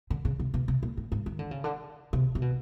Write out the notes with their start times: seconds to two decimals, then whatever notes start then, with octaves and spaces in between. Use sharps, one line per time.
0.10 D3
0.25 C#3
0.40 C3
0.54 B2
0.68 C3
0.83 A#2
0.97 A2
1.12 G#2
1.26 D#3
1.39 D3
1.51 C#3
1.64 D3
2.13 C3
2.35 C3
2.42 B2